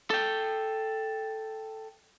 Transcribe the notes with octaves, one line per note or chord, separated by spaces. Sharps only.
A4 G5